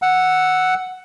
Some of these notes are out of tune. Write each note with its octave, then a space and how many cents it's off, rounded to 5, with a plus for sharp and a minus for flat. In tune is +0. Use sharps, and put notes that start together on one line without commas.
F#5 +0 E6 +0